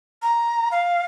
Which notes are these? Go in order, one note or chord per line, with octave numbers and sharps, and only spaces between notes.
A#5
F5